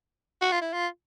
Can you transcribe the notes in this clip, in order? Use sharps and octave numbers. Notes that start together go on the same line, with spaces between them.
F#4
F4
E4
F4